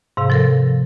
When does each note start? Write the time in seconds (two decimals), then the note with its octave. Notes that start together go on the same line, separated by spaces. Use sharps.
0.17 G#2 C3 F5
0.30 F3 A4 A#4